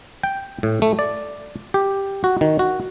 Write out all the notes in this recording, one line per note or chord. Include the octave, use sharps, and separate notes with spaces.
G5
A2
A3
D5
G4
F#4
D#3
F#4